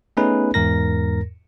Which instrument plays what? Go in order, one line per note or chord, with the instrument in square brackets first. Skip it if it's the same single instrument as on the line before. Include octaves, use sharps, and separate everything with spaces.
[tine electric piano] A3 B3 C#4 D#4 G#4 B4
E2 G#2 A#4 A#6